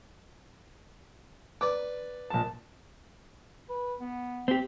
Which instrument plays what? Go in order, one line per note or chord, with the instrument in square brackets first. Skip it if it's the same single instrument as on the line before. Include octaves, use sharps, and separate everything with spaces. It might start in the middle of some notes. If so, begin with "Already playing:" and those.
[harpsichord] B4 D5 [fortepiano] D6
[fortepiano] A#1 A5
[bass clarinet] B4
B3
[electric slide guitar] C4 G4